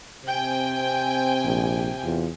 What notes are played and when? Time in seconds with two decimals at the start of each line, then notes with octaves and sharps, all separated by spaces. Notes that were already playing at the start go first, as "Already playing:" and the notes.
0.25 C3 C4 G5 G#5
1.45 A#1
2.04 E2 F4